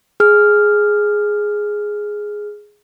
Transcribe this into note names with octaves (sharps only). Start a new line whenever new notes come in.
G#4 F6